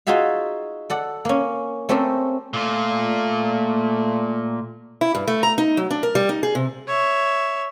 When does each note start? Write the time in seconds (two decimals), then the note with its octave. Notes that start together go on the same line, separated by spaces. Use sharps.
0.07 D#4 F4 F#4 G#4 E5 F5
0.90 A4 D5 F#5
1.25 A#3 C#4
1.89 A3 C4 C#4 G4 A4 A#4
2.53 A#2 A3 F4
5.01 E4
5.15 G2
5.28 A3
5.43 A#5
5.58 D#4
5.77 F#3
5.91 D4
6.03 A#4
6.15 G3
6.29 D#4
6.43 G#4
6.55 C3
6.87 C#5 E5